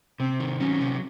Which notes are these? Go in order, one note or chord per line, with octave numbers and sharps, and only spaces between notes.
C3 C4
D#3
F#3 C#4
C3